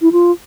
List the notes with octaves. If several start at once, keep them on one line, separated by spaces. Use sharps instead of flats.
E4
F4